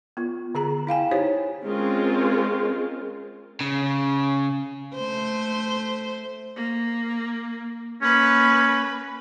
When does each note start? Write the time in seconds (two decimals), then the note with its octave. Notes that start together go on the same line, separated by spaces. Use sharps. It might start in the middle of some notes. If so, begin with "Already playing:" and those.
0.17 B3 F4
0.55 D3 G#4 A#5
0.87 E4 F5 G5 G#5
1.11 D#4 E4 G4 C5 C#5
1.66 G#3 C4 C#4 F4 G#4 A#4
3.61 C#3
4.96 A3 C5
6.56 A#3
8.02 A#3 C#4 B4